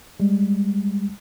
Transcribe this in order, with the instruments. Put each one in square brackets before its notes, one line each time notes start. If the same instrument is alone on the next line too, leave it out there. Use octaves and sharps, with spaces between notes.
[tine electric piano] G3 G#3